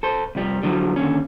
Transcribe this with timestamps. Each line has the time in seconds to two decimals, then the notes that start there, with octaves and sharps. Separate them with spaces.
0.03 A4 C5
0.35 C2 F2 F3 G3
0.63 D3 F3 F#3
0.96 D#2 D3 C#4